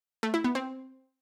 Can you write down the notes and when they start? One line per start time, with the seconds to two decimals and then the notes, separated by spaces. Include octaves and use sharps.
0.23 A3
0.34 E4
0.44 B3
0.55 C4